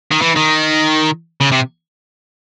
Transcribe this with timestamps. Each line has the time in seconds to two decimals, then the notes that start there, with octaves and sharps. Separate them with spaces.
0.12 D#3
0.22 E3
0.36 D#3
1.41 C#3
1.52 C3